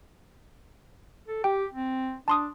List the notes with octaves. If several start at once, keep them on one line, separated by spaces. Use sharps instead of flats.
A4
G4 G5
C4
D4 A5 C6 D#6